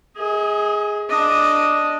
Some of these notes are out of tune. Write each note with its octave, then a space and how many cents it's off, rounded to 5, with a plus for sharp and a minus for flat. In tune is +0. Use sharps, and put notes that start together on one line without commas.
G#4 +0 D#5 +35
D4 +0 D#5 +0